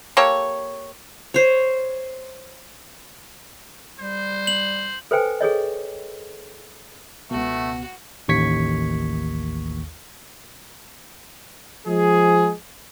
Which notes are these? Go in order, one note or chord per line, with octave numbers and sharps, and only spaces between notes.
A#3 G4 A4 C#5
C5 C#5
G3 C5
F#7
A4 B4 C5 G5 G#5
G#4 A4 C#5 D#5
C#2 B2 A3 B3 F#4
A1 D#2 C#6 G#6 B6 C#7
F3 G#3 G#4